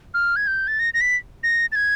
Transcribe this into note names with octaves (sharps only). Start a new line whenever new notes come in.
F6
G#6
G6
A6
A#6
A#6
B6
A#6
A6
G#6